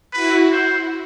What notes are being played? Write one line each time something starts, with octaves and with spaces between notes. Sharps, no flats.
E4 F#4 B4
C5